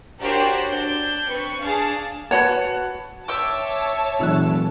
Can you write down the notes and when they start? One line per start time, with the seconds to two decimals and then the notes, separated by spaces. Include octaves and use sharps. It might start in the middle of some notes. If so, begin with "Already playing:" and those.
0.21 D4 F#4 G4 A#4 C5 C#5
0.71 D4 G6
1.30 C4 B4 C#6 C#7
1.62 D4 G#4 F5 A5
2.31 F#4 B4 C#5 F#5 A5
3.28 C#5 E5 G5 A5 D6
4.19 F1 A#2 E3 F#3